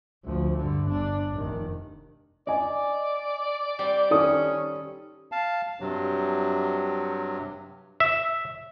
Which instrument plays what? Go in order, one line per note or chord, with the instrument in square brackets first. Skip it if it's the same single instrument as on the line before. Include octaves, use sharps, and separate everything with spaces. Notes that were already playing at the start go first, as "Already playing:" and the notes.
[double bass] D2 F3
G2 D3
G1 D4
F1 D#3
[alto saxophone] D5 [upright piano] D#5 G#5
[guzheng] G3 C4
[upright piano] D#3 A4 D#6 [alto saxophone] C#4
[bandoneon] F5 A5
G2 C3 F#3
[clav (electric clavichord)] E5